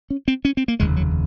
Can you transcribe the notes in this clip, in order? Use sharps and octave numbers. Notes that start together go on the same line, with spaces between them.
C#4
C4
C#4
C4
A#3
F1 D#2 C#3 G#3
F#3